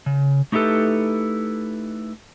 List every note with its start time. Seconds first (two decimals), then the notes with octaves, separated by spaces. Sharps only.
0.06 C#3
0.52 A3 D#4 E4 G4 A4 B4